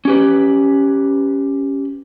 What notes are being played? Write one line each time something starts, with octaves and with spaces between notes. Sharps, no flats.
C#4 G4 B4